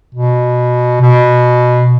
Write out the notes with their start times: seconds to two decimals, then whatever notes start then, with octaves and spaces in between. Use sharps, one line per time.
0.14 B2
1.01 B2